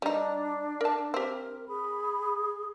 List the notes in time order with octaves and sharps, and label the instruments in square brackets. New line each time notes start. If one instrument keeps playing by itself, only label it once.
[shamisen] G3 D#4 [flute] D4
[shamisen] A#4 A5
[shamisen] C4 G4 [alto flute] A#4
[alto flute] G#4 [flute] B5